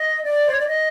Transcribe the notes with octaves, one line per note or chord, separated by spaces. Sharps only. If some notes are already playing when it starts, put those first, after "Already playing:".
Already playing: D#5
D5
C5
C#5
D5
D#5